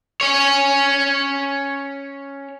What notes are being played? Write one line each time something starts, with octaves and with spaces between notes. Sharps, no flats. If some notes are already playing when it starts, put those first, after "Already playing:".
C#4 C#5